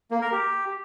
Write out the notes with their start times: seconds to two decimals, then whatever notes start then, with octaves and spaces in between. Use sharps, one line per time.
0.11 A#3
0.22 A#4
0.32 G4